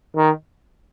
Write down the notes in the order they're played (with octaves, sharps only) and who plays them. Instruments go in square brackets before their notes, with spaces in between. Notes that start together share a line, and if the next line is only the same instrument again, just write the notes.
[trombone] D#3